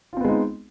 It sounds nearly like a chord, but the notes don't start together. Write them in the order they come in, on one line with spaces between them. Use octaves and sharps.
F4 C4 B3 G#3 D#4